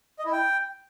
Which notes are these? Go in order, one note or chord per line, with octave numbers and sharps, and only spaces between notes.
D#5
E4
G5